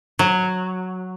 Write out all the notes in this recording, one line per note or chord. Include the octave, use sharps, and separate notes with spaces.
F#3